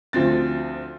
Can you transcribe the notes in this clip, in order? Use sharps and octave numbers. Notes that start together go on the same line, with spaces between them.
D2 F3 C4 A6